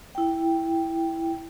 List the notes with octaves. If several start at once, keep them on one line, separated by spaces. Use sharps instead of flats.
E4 G5